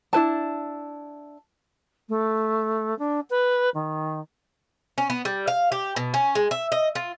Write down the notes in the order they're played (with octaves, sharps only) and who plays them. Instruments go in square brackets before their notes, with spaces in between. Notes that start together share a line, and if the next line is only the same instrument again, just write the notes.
[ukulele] D4 E4 B4 A5
[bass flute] A3
D4
B4
D#3
[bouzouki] C#4
B3
G3
F5
G4
B2
C#4
G#3
E5
D#5
F4